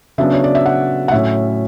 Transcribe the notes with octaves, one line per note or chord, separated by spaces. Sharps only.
C#3 F#3 B3 D4 E5
C#5
D5
E5
F#5
F#5
A2 F#3 C#4 E5